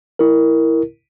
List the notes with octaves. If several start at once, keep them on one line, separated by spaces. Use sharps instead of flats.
E4 A#4